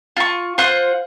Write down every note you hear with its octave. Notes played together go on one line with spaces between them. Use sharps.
F4 C#6
F4 C5 F#5 C6